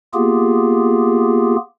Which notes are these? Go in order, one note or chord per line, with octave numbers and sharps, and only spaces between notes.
A#3 B3 F4 G4 G#4